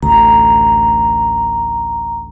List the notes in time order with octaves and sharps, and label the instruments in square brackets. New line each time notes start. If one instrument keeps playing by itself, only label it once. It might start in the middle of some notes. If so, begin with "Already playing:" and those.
[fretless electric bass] A1 D2 [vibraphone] A#5